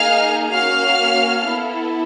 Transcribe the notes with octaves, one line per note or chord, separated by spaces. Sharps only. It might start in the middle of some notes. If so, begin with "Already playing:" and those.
Already playing: A#3 D#4 G#4 F5 F6
A#3 C#4 F#4 F5 F6
B3 E4 A4